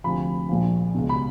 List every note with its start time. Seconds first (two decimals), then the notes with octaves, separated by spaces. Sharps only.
0.04 D2 C3 F3 B5
0.49 A#1 A#2 F3
0.95 C#2 B2
1.09 B5